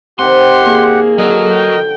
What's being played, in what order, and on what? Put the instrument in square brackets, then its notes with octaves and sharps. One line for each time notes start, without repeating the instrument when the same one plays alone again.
[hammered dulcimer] C3 D#3 [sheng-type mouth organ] G4 F#5 [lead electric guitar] C6
[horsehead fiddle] A#3 G#4
[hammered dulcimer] D3 [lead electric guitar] F#3 [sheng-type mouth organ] A#4 D#5
[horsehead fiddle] G5